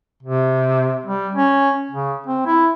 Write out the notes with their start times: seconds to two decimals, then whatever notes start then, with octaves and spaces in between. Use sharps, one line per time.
0.23 C3
1.06 G3
1.35 C#4
1.91 C#3
2.27 C4
2.46 E4